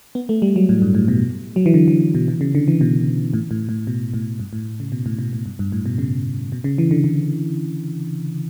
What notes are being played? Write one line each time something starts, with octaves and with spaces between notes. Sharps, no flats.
B3
A3
G3
F#3
A2
G2
A2
B2
F#3
E3
D3
E3
B2
B2
C#3
D3
E3
B2
A2
A2
A2
B2
A2
G2
A2
C#3
B2
A2
B2
A2
G2
G2
A2
B2
C#3
B2
C#3
E3
D3
D3